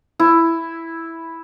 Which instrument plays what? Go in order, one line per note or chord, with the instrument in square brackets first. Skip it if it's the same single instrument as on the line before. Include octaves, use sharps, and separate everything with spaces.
[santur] E4